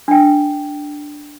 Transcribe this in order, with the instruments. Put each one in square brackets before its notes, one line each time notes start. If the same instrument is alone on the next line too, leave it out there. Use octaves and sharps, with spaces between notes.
[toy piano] D4 G5